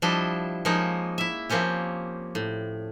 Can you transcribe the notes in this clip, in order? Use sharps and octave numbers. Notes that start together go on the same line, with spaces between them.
F3 G3 D4 E4 D#5
F3 G#3 A#3 C#4 D#4
E4 E5
F3 A#3 C4 C#4 G4
A2